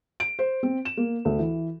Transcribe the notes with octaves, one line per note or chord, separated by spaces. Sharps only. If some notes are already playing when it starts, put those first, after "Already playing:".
D7
C5
C4
E7
A#3
D2
E3